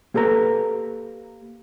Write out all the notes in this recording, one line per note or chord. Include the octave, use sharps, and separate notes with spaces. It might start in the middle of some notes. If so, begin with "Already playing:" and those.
A#3 G4 A4 B4 A#5